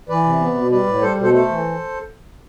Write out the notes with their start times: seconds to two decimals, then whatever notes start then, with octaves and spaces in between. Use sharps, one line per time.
0.09 E3 B4 D5
0.24 C3
0.40 B3
0.55 B2
0.71 G3 B4 D5
0.87 A2
1.01 G3 A4 C5
1.18 B2 A4 C5
1.32 A3 A4 C5
1.49 E3